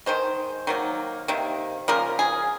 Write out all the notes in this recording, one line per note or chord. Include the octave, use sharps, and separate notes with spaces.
D#3 G#3 C5
D#3 F#3 A#3
C3 D#3 A#3
C#3 F3 A#3 A#4
G#4